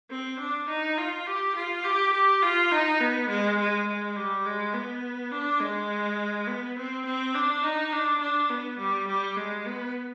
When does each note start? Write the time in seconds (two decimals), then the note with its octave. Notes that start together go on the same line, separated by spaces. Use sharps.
0.10 C4
0.40 D4
0.68 D#4
0.98 F4
1.26 G4
1.56 F4
1.84 G4
2.14 G4
2.42 F4
2.71 D#4
3.01 B3
3.29 G#3
3.59 G#3
3.87 G#3
4.16 G3
4.45 G#3
4.73 B3
5.32 D4
5.61 G#3
6.47 B3
6.76 C4
7.06 C4
7.35 D4
7.63 D#4
7.92 D4
8.21 D4
8.50 B3
8.79 G3
9.07 G3
9.37 G#3
9.66 B3